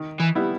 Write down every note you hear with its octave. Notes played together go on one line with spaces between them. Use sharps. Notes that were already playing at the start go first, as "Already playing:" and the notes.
Already playing: D#3
E3
G3 B3 E4